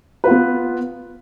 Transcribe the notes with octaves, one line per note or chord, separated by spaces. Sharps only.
B3 F4 B4